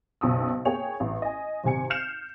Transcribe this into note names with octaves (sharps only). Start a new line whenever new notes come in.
F#1 B1 D#6 E6
A#3 G#4 C#5 G5 G#5 F7
A1
D#5 G#5
G#1 C3 G#5 C#7
F6 G6 C7 C#7 E7 F7